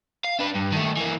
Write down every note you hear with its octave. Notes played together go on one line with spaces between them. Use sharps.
F5
D4 B4
G2
D#3 A3
E3 A#3